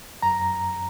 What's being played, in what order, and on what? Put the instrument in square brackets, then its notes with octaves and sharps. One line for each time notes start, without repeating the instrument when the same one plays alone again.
[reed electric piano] F#2 A#5